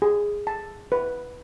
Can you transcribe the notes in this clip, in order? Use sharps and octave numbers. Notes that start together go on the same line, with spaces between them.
G#4
A5
B4